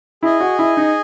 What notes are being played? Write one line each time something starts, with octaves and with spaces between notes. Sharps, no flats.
E4 G#4 D#5 G#5
F#4
E4
D#4